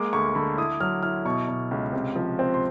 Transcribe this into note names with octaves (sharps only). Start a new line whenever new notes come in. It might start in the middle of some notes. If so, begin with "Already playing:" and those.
Already playing: G#3 A#3 D6
D2 C#6
D3 B5
E4 D#6
F#3 F6
E4 F6
B2 C#6
B2
C#2
C3
F3
C4
C6